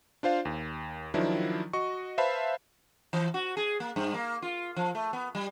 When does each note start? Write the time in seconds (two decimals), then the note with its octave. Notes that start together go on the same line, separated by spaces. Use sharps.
0.23 D4 F4 C5 F5
0.45 D#2
1.14 D#3 F3 F#3 D4 E4
1.73 F#4 D#5 C#6
2.18 B4 C5 E5 F5 A5 B5
3.13 E3
3.34 F#4
3.57 G#4
3.80 A#3
3.96 G2
4.14 A#3
4.42 F4
4.76 F3
4.95 A3
5.13 B3
5.35 G3